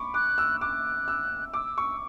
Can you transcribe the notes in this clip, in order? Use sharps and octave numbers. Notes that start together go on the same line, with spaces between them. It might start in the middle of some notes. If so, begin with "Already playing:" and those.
Already playing: B5 C#6 D6
D6 F#6
E6
D6 F#6
E6
D6 E6
C#6